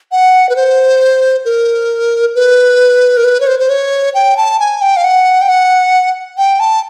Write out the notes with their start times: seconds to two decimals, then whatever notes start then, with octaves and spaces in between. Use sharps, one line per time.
0.12 F#5
0.49 B4
0.56 C5
1.45 A#4
2.35 B4
3.17 A#4
3.24 B4
3.41 C#5
3.47 C5
3.59 C5
3.70 C#5
4.14 G5
4.37 A5
4.59 G#5
4.81 G5
4.97 F5
5.04 F#5
5.42 G5
5.49 F#5
6.38 G5
6.60 A5